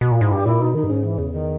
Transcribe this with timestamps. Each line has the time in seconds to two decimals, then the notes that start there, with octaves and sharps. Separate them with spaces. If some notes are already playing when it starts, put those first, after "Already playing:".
0.01 B2
0.11 A#2
0.21 G#2 E4
0.31 G2 G4
0.46 A#2 E4
0.60 B2 D#4
0.75 D#3 D#4
0.84 G2
0.89 G#2 C#4
1.03 E3
1.18 E2 C#3
1.32 D#3